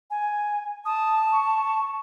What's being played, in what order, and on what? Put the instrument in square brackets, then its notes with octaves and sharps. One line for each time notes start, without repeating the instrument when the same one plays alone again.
[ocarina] G#5
[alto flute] A5 [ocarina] D#6
[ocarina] C#6